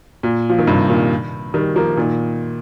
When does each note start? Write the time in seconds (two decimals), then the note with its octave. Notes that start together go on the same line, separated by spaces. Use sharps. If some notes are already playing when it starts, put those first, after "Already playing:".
0.23 A#2
0.50 F3
0.59 D#3
0.67 G2 C3
0.89 A#2 D#3
1.54 D#3 G3
1.76 F3 A#3
1.97 A#2 D#3